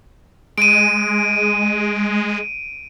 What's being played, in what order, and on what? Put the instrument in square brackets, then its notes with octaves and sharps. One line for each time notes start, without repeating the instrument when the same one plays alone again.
[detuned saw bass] G#3 [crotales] D7 D#7